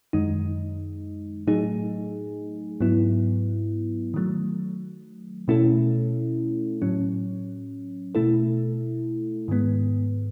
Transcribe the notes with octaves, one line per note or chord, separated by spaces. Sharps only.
F#2 D#3 G#3 D#4
A2 F#3 A3 D#4 G#4
G#2 F#3 B3 E4
D#3 F#3 A3
B2 A3 C#4 E4 A4
A2 F#3 C#4
B2 A3 E4 A4
G#2 D#3 G#3 B3